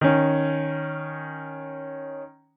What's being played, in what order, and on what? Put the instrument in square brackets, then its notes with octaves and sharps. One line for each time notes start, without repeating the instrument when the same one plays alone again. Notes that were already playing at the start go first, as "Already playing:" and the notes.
[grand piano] D#3 C#4